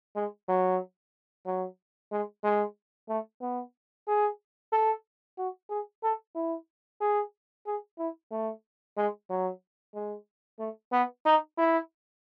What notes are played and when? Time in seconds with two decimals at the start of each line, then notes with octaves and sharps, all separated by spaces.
0.16 G#3
0.48 F#3
1.46 F#3
2.12 G#3
2.44 G#3
3.09 A3
3.42 B3
4.08 G#4
4.72 A4
5.38 F#4
5.70 G#4
6.03 A4
6.35 E4
7.01 G#4
7.66 G#4
7.98 E4
8.31 A3
8.97 G#3
9.30 F#3
9.95 G#3
10.59 A3
10.92 B3
11.26 D#4
11.58 E4